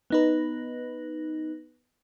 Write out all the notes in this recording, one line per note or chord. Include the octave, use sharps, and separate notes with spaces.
B3 D#4 B4